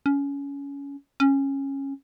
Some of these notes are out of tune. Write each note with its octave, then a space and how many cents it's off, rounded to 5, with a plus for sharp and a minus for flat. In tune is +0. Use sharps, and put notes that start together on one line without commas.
C#4 +20
C#4 -15